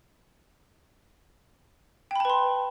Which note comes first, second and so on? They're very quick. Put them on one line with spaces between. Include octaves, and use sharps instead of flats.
G5 B5 A5 B4 C6